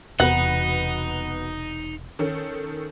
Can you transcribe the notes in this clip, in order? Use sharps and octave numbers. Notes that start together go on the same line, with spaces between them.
E1 E2 C3 B3 D#4 F#4 B4 F#5
D#3 C#4 A4